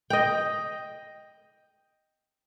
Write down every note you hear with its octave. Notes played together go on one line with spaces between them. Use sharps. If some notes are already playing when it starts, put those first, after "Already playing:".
D#5 G5